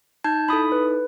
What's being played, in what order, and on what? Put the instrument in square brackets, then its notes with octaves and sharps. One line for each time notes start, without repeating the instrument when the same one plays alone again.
[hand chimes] D#4 G6 G#6 [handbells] A5
[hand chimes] D#4 E4 A4 [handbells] B5 D#6
[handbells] B4